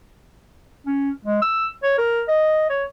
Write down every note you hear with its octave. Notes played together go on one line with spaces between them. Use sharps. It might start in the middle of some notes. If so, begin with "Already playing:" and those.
C#4
G#3
E6
C#5
A#4
D#5
C#5